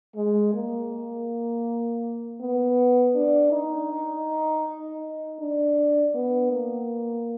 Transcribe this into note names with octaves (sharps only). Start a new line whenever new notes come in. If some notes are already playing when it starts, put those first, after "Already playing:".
G#3
A#3
B3
D4
D#4
D4
B3
A#3